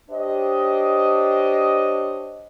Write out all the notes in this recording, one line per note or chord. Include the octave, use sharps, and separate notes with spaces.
D4 G4 C5 C#5 D#5